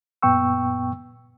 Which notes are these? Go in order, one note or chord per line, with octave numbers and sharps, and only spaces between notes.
F#2 A#2 B3 G5 C#6 E6